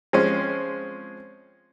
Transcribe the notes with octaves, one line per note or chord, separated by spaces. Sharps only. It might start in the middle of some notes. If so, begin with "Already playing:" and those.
F3 G#3 C4 C#4